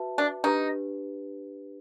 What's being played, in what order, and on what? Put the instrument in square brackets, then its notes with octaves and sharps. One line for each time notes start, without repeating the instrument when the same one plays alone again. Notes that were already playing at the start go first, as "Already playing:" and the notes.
Already playing: [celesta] F#4 B4 E5 A5
[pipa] D4
[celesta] D4 G4 B4 [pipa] D#4